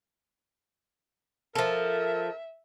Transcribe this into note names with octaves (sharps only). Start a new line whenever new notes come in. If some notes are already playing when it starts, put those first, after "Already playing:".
F3 A4 A#4 E5